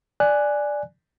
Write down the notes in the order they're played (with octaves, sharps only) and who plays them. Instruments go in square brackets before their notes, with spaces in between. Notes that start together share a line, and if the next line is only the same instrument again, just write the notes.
[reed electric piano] D5 G#5 F#6